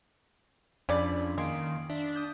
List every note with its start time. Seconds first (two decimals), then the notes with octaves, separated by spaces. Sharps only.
0.89 F2 C#3 C#4 D4 D5 B5
1.38 D#3 G#3 A#3 F5 D7
1.90 D4 D5 E5
2.16 D#6 G6